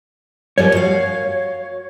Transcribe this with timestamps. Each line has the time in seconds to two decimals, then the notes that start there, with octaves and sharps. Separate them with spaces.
0.58 F#2 F3 G3 C#5
0.75 F#4 F5